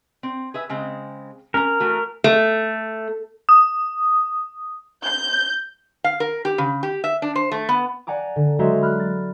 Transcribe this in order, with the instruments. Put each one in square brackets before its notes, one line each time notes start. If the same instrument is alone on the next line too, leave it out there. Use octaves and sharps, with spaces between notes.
[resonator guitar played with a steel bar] C4
G#4 B4 E5
C#3 G#3 C4
[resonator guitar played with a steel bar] C#4 A#5 [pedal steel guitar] A#4
[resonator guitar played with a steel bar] E3 A3 F#4
A3
[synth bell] D#6
[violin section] G6
[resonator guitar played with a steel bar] F5
A#4
G4
C#3
G4
E5
D4
C5
A3
B3
[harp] D5 F#5 G#5 A#5 D6
D3
F#3 G#3 F#4 C5 E5 A#5
B5 F6 F#6
A6